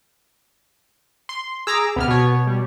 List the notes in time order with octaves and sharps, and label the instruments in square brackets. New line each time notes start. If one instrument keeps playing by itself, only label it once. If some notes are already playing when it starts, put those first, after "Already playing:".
[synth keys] C6
[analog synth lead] G#4 [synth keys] A#5 D6 E6
[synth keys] C#2 C3 F6 [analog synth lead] B3
[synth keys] B2 C#5
[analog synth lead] G3